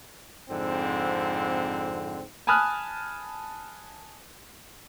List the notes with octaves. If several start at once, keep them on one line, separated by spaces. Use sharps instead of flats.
F2 G#2 D3 C4
G#5 A5 B5 D#6 F6 F#6